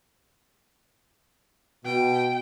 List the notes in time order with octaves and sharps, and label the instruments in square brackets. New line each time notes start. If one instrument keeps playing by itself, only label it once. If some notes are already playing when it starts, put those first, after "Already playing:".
[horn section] B2 [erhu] G5